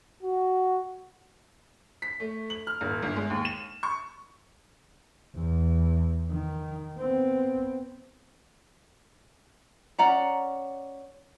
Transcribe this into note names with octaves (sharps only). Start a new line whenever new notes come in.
F#4
B6
A3
F#7
F6
D#1
G1
G#3
D#2
E7
C#6
E2
D#3
B3 C4
C#4 D5 F#5 A#5